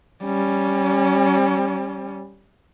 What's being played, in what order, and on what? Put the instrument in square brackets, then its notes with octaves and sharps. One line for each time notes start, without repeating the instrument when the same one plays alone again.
[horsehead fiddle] G3 C#4